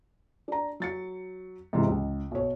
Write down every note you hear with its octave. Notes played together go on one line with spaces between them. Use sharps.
D4 A#5
F#3 A6 C#7
G#2 C3 E3
C#2
B1 C#5